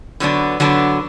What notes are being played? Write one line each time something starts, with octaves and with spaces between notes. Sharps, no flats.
D3 F#3 B3 D4
D3 F#3 B3 D4